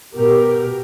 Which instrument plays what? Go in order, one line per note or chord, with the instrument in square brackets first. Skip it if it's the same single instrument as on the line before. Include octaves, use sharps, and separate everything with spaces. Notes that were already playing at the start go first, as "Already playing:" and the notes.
[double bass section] B2 [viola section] G4 A#4